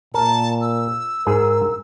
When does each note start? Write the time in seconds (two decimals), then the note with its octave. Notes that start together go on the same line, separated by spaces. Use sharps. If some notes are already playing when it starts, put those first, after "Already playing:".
0.14 A#2 A#4 A5
0.62 E6
1.27 G#2 G#4 A#4